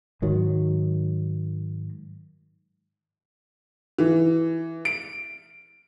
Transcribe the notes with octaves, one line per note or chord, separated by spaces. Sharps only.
G#2 D#3 F#3
E3
D7